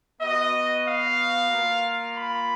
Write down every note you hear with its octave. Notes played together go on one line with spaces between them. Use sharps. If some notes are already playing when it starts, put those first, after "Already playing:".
B3 F#4 D#5
F5
A#3 F4
B5